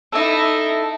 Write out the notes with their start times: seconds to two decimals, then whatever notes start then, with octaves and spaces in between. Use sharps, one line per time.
0.12 D#4 E4 A4 E5